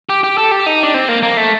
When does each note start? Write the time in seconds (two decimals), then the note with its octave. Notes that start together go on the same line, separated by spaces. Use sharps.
0.09 G4
0.24 G4
0.38 A4
0.51 G4
0.66 D#4
0.83 D4
0.94 C4
1.09 A#3
1.23 A#3
1.37 A3